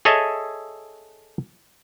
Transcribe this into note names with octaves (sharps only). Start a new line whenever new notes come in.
G#4 A4 C#5 D#5 E5 A5